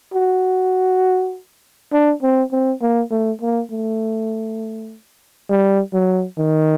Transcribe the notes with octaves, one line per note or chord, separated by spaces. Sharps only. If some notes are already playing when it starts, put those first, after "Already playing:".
F#4
D4
C4
C4
A#3
A3
A#3
A3
G3
F#3
D#3